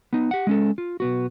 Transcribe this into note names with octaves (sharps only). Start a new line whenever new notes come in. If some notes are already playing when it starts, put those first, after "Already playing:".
B3 D#4
G4 F#5
G#3 C#4 A4
F4
B1 B3 F#4